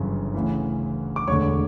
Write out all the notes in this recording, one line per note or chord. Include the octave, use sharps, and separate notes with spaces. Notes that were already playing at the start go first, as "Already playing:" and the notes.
Already playing: G1 F#2 C#3 E3
D2 C#3 E3
D6
E1 D2 D3 C#5 C#6